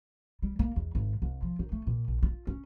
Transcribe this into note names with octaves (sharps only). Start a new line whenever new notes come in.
G3
A#3
E2
G#1
C2
F3
D#3
A3
A#2
A#1
F4
C#4